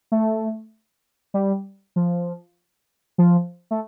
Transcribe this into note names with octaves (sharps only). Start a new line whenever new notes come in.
A3
G3
F3
F3
A3